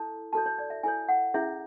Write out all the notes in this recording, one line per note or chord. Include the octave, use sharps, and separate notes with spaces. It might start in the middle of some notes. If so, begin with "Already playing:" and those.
Already playing: E4 A4 C#5 A5
F#4 A4 C#5 A5
C#5
D5
E5
E4 A4 C#5 G#5
F#5
C#4 E4 G#4 C#5 E5